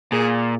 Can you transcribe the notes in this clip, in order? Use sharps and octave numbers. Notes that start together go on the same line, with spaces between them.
A#2 G#4